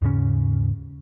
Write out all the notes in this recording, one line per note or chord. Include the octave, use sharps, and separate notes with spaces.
D#2 G#2 C#3 C#4